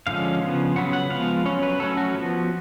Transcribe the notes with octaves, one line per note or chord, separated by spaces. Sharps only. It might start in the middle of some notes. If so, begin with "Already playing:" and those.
D3 F3 G#3 C#4 F5
C#3 F3 B3
C#3 F#3 B3 F#5
F#5
F3 G#3 B3 F5
F#3 C#4 C#5
B4
F#3 A3 C#4 A4
F#4
F3 B3